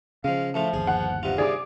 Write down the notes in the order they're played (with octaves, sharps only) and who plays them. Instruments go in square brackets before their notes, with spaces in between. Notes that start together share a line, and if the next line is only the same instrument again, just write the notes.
[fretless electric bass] C#3 [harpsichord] F3 G#3 [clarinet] F5
[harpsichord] A2 A3 F4 [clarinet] F3
[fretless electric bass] G1 D#2 [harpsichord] G#4
[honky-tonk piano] F#5
[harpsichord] G2 C3 F4
[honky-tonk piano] G#4 D6 [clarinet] D5